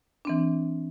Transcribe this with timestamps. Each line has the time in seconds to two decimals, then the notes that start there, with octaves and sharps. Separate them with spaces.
0.25 E3 C4 D4